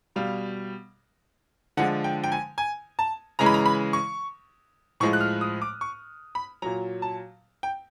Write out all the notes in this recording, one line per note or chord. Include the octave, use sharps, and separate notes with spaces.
B2 G3 F5
D3 F3 G#3 F#5
G5
G5
G#5
G#5
A5
C#3 E3 G#3 A#5
B5
A#5
B5
C#6
A2 F3 G#3 C#6
F#6
F6
D#6
D6
C#6
B5
A#2 F#3 A#5
A5
G5